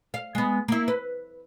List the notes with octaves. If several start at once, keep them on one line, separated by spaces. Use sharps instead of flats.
F5
G#3 B3
A#3 E4
B4